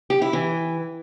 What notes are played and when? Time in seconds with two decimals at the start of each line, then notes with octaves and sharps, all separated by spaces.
0.10 G4
0.22 E4
0.33 E3